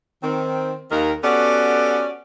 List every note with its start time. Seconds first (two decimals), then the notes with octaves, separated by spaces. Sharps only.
0.22 D#3 C4
0.90 D#2 D#3 A#4
1.23 B3 C#4 F#4 G4 A4 D5